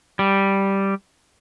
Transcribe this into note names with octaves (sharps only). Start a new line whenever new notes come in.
G3